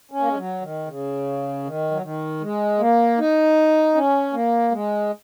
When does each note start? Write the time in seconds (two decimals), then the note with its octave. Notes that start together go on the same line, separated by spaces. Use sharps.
0.11 C#4
0.20 A#3
0.28 G#3
0.37 F#3
0.62 D#3
0.87 C#3
1.65 D#3
1.91 F#3
2.02 D#3
2.41 G#3
2.79 A#3
3.18 D#4
3.95 C#4
4.33 A#3
4.71 G#3